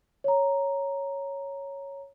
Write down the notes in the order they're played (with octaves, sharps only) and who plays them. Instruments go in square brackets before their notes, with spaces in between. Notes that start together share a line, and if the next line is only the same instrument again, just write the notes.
[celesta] C#5 A#5